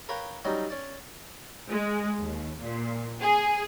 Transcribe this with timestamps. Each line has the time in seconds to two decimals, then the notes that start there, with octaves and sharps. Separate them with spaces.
0.09 A#4 B4 C#5 F5 G5 A#5
0.45 F#3 G3 C#4 D#4
0.70 C#4 D5
1.70 G#3
2.19 D#2
2.60 A#2
3.21 G#4